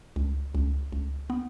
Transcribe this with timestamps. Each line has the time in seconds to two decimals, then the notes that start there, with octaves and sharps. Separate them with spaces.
0.16 C#2
0.55 C#2
0.92 C#2
1.30 B3